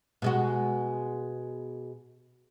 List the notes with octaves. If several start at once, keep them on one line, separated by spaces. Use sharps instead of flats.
B2 G#3 F#4